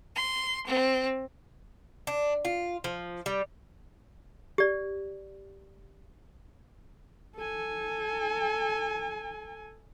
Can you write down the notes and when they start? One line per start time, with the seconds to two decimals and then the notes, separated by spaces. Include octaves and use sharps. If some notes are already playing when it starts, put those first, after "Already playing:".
0.16 C6
0.65 C4
2.07 D4
2.45 F4
2.84 F3
3.26 G3
4.58 G4 D5
7.36 A4 G#5